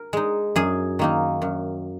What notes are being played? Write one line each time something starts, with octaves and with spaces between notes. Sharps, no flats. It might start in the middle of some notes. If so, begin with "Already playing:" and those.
Already playing: A#4
G#3 D#4
F#2 G#4
D#3 A#3 D#4
F#2